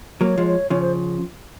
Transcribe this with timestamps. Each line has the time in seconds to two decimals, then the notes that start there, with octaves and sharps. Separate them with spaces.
0.21 F#3 A#3 C#5
0.38 F3 G#3
0.46 C#5
0.70 C#3 F3 C#5
0.81 C5